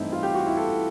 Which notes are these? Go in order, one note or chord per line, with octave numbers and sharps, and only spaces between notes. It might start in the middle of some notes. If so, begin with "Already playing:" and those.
Already playing: G2 E3 A3 C4 D#4 E4
F4
G4
F#4
E4
A4